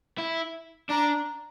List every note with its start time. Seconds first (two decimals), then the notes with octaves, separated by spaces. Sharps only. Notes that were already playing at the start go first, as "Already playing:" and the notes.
0.19 E4
0.89 D4 A#5